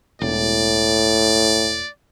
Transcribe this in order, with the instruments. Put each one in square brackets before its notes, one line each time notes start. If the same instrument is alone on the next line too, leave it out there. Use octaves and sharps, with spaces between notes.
[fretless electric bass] E1 [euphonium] A2 [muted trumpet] D5